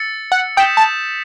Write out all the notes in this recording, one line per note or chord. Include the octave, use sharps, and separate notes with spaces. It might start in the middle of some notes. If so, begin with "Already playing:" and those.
Already playing: E6 A6 C#7
F#5
G5 D#6 G6 B6 E7
A5